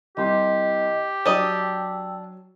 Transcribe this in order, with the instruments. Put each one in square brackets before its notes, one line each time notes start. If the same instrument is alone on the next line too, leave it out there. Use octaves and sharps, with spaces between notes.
[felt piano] C2 C6 [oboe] G4 [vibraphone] D#5
[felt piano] F#3 [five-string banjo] D4 D#5 [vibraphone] G5 E6